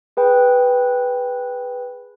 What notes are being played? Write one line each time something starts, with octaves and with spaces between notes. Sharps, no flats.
G#4 B4 G5